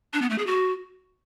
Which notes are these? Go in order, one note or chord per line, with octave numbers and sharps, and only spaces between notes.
D4
B3
A3
G#4
F#4